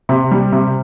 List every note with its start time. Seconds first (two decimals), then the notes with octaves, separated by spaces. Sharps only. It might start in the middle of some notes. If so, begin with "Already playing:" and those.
0.09 C3
0.31 G3
0.52 C3